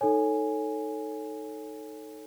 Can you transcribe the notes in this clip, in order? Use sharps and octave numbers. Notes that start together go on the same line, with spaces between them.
D#4 A4 C#5 G#5